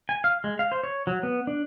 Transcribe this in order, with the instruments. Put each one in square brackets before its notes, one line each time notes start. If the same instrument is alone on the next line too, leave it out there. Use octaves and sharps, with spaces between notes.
[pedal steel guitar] G#5
F5
G#3
F5
C5
C#5
F#3
B3
D4